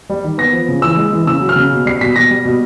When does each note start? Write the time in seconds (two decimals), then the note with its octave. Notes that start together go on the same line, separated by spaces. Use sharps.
0.10 G3
0.24 D#3
0.38 B3 A#6
0.53 F3
0.69 C#3
0.82 E3 E6
0.97 G#3
1.12 E3
1.27 C#3 E6
1.41 F#3
1.49 F6
1.56 C#3
1.72 B2
1.85 G3 C7
2.01 B2 B6
2.16 B2 A#6
2.30 G3
2.45 B2